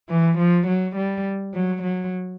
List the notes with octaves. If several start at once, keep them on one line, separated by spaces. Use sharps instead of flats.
E3
F3
F#3
G3
F#3
F#3